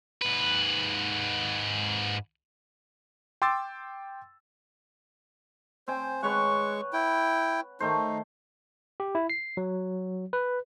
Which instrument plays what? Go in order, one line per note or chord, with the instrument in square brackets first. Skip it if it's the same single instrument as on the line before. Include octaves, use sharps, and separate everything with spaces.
[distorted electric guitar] G#2 B4
[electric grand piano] G5 C6 D6 E6 A6
[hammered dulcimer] C4 G5 G#5 [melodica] C5
[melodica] G#3 C#6 [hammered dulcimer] B4 C#5 F#5
[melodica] E4 G5
[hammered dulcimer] D#3 A3 C5 [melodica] D#4
[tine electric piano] G4
E4
C7
F#3
B4